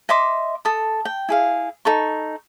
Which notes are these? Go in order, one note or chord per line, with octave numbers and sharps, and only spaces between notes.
D#5 E5 C6 D6
A4 D#6
G5
E4 G#4 F5
D#4 A4 C#6